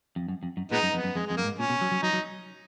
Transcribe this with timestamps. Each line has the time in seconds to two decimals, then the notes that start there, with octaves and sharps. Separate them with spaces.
0.16 F2
0.28 F#2
0.43 F2
0.57 F#2
0.71 A#2 G#3 B3 D#4
0.83 F#2
0.93 F2 B3
1.04 F#2
1.15 F2 G#3
1.26 F2 G#3
1.37 F#2 A#3
1.44 G#2
1.59 A#2 C#4
1.70 B2
1.81 F#3
1.91 F#3
2.03 F#3 D#4
2.13 F#3